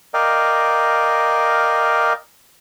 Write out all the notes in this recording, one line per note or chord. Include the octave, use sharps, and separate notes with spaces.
A#4 D5 D#5 F5 G5